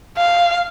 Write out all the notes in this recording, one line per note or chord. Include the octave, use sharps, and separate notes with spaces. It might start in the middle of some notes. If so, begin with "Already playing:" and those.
F5